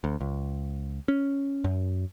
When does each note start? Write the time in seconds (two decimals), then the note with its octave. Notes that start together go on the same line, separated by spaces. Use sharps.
0.04 D2
0.20 C#2
1.08 C#4
1.64 F#2